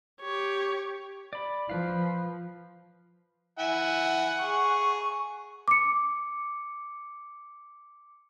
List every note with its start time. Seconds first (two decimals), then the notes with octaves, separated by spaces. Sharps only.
0.21 G4 C#5
1.33 D5 B5
1.69 F3 B4 F5
3.59 E4 E5 F#5 G#5
4.42 G#4 C#6
5.68 D6 C#7